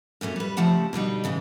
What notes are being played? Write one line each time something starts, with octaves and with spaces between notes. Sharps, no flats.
F#2 A#2 A3 C#4
G3 B4
C#3 F3 A3 G4 F#5 A5
B2 D3 G3 D#4
A2 C#3 E3 G#3